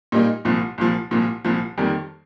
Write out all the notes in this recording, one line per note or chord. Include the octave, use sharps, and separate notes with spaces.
A#2 G3 A#3 D#4
C2 A#2 F3
C2 A#2 F3
C2 A#2 F3
C2 A#2 F3
F2 D#3 G3 A#3